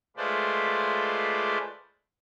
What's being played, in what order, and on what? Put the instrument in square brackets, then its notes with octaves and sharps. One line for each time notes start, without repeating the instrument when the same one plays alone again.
[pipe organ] G#3 A3 F4 B4 C5 D5